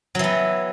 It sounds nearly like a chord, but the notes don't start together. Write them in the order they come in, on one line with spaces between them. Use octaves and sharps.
F#3 E3 B3